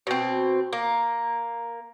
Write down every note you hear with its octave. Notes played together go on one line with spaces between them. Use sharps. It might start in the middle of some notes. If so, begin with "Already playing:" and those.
B2 C4
A#3